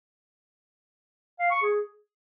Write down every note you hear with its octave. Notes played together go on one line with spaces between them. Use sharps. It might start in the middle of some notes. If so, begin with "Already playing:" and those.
F5
C#6
G#4